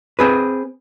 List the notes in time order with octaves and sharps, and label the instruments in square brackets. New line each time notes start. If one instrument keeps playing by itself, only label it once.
[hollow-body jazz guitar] C4 G#4 B4